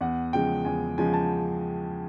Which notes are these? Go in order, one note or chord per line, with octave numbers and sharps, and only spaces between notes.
E2 F#5
C#3 F3 G#3 G5
E2 G#5
C#3 F3 G#3 G#5
A5